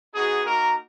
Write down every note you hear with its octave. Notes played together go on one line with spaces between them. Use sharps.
B3 D#4 F#4 G#4
A#3 D#4 F#4 A#4